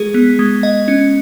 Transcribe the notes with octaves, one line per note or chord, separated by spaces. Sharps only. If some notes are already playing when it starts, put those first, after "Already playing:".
Already playing: G#3 G#4
B3
G#3
D#5
C#4